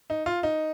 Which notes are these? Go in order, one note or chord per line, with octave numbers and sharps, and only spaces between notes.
D#4
F4
D#4